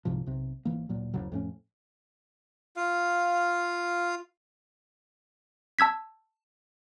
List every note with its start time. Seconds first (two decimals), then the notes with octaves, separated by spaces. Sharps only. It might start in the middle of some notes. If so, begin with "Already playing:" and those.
0.05 C2 G#2 C3 F3
0.26 B1 C3
0.65 G#1 E3 A#3
0.89 D1 A#2 F#3
1.14 F#1 D2 C#3 F#3
1.32 F2 A2 C#4
2.76 F4 F5
5.79 A5 E6 G#6 B6